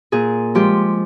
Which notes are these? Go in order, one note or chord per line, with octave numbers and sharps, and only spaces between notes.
A#2 G#4
F3 G#3 G4